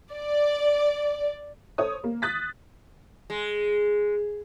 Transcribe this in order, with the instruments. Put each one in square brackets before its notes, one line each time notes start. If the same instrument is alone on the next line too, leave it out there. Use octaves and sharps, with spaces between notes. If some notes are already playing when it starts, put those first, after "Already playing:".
[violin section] D5
[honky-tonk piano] A4 C5 C#5 D#6
A#3
D#6 F#6 A6 B6
[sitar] G#3